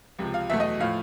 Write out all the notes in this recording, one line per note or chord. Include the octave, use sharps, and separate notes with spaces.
C#2 C3 F3
F5
E2 B2 F#3 A3 E5
D#5
A2 F3 A3 F5